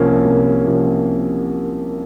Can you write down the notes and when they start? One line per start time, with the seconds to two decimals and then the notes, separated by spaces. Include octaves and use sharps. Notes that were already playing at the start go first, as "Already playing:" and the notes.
Already playing: C2 C3 F3 A#3 C#4
0.25 C2
0.67 C3 F3 A#3 C#4